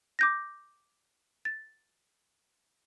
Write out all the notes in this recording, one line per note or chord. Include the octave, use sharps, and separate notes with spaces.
D6 G6 A#6
A6